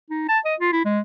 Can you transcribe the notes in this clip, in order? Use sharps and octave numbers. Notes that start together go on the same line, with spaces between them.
D#4
A5
D#5
F4
E4
G#3